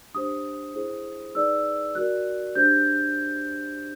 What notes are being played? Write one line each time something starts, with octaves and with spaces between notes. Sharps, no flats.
D4 G4 C5 D#6
E4 G#4 C5
D#4 G#4 B4 D5 E6
F#4 A#4 D5 F#6
D4 G4 C5 G6